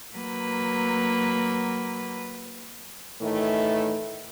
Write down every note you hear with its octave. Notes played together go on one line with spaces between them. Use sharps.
F#3 A#3 B4
A2 D#3 E3 A3